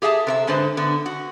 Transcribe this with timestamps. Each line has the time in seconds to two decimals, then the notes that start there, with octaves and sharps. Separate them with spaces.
0.02 G4 G#4 E5 F5 A5
0.27 C3 A#4 E5
0.47 G#2 D3 B4 C5
0.77 D3 B3
1.06 F#4